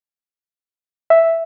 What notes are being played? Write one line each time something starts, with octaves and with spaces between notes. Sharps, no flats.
E5